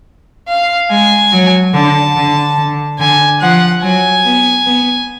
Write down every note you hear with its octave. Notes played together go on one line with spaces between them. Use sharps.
F5
G#3 G#5
F#3
D3 A5
D3
D3
D3 G#5
F3 F#5
F#3 G#5
B3
B3